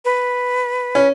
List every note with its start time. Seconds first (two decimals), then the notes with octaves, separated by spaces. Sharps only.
0.05 B4
0.95 C#4